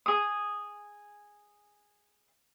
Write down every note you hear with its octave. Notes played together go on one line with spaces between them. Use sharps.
G#4 D#6